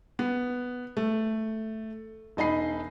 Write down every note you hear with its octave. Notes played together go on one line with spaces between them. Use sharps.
B3
A3
E1 D#4 D#5 B5 C7